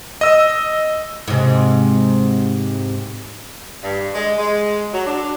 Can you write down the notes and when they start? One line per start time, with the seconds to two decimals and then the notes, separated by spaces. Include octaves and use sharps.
0.21 D#5 E6
1.28 G#2 C3
3.83 G2
4.14 G#3
4.37 G#3
4.94 F#3
5.07 D4